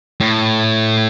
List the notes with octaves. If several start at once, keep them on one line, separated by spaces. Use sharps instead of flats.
A2